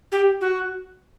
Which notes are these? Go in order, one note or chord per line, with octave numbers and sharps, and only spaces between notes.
G4
F#4